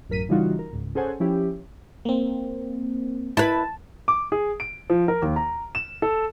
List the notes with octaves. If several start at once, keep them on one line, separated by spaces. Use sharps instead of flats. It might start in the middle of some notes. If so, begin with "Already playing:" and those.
A1 F#2 A#4 B6 D#7
C#3 E3 G3 D#4 F4 F#4
A#4
C#2 G#2
C#4 G#4 A4 C5 F#5 G#5
F3 C#4 E4 G4
A#3 C4
E4 B4 A5
D6
G#4
D7
F3
A#4
D#2
A#5
E7
A4